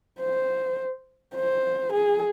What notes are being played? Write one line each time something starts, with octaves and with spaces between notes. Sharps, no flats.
C5
C5
G#4